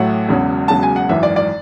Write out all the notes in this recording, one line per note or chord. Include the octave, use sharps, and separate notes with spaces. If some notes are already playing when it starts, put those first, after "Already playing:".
Already playing: A1 A2 F#3 A3 F#5
E1 E2 C#3 F#3
E1 E2 C#3 F#3 A5
G#5
F#5
G#1 F#2 E3 E5
D5
D5